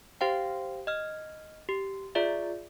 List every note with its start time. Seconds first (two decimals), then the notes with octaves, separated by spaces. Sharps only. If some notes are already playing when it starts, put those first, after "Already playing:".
0.21 G4 C5 F5 G5
0.87 D#5 F6
1.69 G4
2.15 F4 G#4 D5 E5